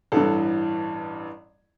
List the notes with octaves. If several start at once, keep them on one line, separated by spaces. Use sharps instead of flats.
A1 G2 E3 A4